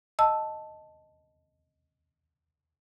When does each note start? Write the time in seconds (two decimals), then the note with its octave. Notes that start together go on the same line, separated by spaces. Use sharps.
0.19 D#5 A5 E6